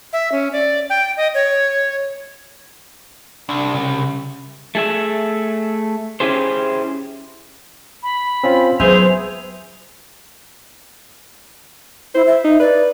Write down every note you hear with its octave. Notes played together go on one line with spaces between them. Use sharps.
E5
C#4
D5
G5
D#5
C#5
C2 D4
C#3
A3 G#4 E5
C#4 E4 G4 G#4 C5
B5
C4 C#4 F4
F#3 B3 C4 G#4 C5 E5 F7
E4 C5
E5
D#4
B4 D5